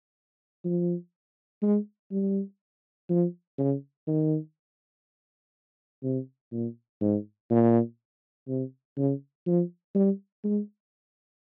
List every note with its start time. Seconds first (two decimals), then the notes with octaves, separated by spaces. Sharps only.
0.65 F3
1.62 G#3
2.11 G3
3.09 F3
3.58 C#3
4.07 D#3
6.03 C3
6.52 A#2
7.01 G#2
7.50 A#2
8.48 C3
8.97 C#3
9.46 F3
9.95 G3
10.44 G#3